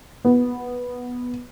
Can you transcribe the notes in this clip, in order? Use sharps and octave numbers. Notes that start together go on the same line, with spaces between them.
B3